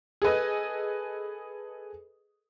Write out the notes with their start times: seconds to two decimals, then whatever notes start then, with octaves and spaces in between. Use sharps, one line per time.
0.22 G#4 A4 B4 D#5